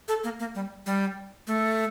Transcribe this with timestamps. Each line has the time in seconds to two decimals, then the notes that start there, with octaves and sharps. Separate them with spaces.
0.08 A4
0.24 A#3
0.40 A#3
0.55 G3
0.86 G3
1.47 A3